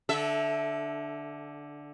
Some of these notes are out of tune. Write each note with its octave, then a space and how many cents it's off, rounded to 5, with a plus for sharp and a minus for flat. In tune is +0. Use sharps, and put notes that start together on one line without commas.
D3 +0 A4 -25 E5 +0